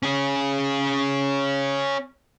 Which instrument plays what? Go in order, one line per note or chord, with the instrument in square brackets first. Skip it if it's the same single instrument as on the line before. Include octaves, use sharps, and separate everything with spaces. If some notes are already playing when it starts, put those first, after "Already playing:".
[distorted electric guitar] C#4 G#4